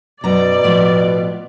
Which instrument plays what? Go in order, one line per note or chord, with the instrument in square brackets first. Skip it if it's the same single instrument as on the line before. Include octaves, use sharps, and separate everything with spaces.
[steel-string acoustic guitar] F#2 A#5 [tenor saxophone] B2 [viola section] D5
[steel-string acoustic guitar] A2 F3 B3